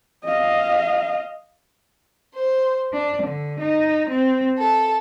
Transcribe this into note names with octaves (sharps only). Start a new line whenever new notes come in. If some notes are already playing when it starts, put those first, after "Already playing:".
D#5 F5
C5
D4
D3
D#4
C4
A4